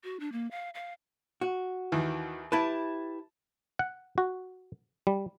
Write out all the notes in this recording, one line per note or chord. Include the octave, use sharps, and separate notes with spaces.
F#4
D4
A#3
F5
F5
F#4
D#2 D#3 E3
E4 G4 B4 A5
F#5
F#4
G3